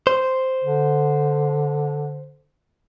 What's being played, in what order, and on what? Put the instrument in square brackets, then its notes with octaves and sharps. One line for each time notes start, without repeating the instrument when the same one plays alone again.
[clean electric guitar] C5
[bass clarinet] D3